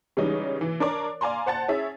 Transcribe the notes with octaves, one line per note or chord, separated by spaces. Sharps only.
C#3 E3 G3 G#3 C#4 D#4
E3
D4 A#4 C#5 D5
D5 F5 G#5 A#5 C6
C5 F#5 A5 A6
C#4 E4 G#4 E5